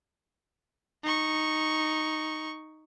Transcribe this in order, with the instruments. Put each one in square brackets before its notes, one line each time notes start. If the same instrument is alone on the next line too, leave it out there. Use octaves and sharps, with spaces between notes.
[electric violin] D#4 C#6